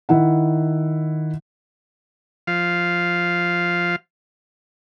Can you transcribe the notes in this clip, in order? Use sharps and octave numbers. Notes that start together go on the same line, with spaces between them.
D#3 E4 F#5
F3 F5